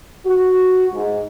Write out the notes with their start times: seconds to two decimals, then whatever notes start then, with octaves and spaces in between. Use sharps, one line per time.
0.26 F#4
0.93 G#2